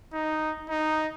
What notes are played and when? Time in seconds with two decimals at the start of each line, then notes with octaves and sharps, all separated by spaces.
0.13 D#4
0.69 D#4